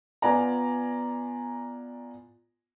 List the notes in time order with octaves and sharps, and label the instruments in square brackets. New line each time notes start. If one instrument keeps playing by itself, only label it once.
[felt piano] B3 F4 D5 G#5 A#5